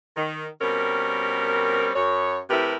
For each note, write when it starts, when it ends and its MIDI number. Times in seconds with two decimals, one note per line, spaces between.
0.17 0.47 51
0.60 1.90 47
0.60 1.90 55
0.60 1.90 60
0.60 1.90 61
0.60 1.90 70
1.95 2.38 42
1.95 2.38 73
2.50 2.75 48
2.50 2.75 57
2.50 2.75 64
2.50 2.75 67
2.50 2.75 70
2.50 2.75 71